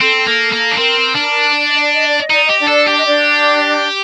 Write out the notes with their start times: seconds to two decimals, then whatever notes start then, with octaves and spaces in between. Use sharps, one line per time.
0.01 C4 A4
0.27 A#3
0.52 A#3
0.71 D4
0.77 C4 A#4
1.15 D4
1.54 D5
1.67 D#5
1.80 D5
1.93 D#5
2.07 D5
2.20 D#5
2.30 D#4 D5
2.46 G4 D#5
2.60 D4 D5
2.68 A4
2.87 G4
2.98 D#5
3.06 D4 D5